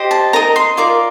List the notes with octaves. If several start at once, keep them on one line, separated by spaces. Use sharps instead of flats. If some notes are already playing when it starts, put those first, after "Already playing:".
Already playing: G4 C5 D#5
A5
D#4 A#4 D#5 A#5
C6
F4 A#4 D5 D6